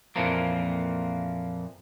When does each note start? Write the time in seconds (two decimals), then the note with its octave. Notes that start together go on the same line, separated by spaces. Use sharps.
0.16 F2 A#2 E3 F3 A#3